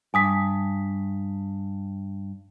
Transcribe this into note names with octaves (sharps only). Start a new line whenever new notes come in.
G2 G#5 D#6 B6